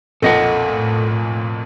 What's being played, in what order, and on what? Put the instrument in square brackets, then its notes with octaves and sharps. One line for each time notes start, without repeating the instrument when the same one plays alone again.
[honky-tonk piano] B1 F2 A#2 [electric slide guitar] A4 D#5 F#5
[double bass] A2